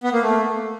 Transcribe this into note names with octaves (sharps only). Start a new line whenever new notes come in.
B3
A#3
A3